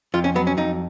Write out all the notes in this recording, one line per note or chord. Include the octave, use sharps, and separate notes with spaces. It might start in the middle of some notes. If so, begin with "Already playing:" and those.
F2 F4
C#4
F#3 B3
C#4
F2 D#4